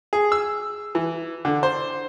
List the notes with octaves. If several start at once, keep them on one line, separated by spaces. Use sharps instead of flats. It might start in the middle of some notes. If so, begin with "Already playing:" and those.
G#4
E6
E3
D3
C5